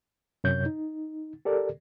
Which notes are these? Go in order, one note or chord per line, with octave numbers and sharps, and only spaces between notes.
F#2 C3 C#5 G6
D#4
G4 A4 A#4 D5